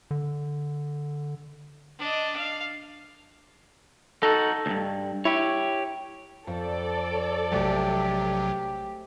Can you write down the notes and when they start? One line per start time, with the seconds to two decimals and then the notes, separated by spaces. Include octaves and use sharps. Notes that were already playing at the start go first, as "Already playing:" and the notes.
0.11 D3
1.99 D4 D#5
2.36 F5
4.23 D#4 F#4 A4
4.66 D2 G2
5.25 E4 G4 C#5
6.47 F2 A4 D5
7.52 A#1 C3 F#3 G#3 A3 F#4 G4